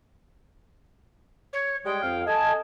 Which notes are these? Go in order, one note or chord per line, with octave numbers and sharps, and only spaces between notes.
C#5
G3 G#3 G5
F2 F5
A4 D#5 G#5 A5